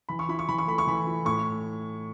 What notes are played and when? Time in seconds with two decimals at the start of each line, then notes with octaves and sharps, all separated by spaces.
0.09 E3 B5
0.19 C#6
0.29 E4 B5
0.39 C#6
0.49 E3 B5
0.58 C#6
0.67 A3 B5
0.78 C#6
0.87 E3 B5
1.06 E4
1.25 A2 C#6